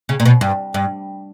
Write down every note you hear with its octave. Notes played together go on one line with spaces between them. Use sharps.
C#3
A#2
B2
G2
G2